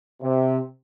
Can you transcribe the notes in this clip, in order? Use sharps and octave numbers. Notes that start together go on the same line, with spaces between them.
C3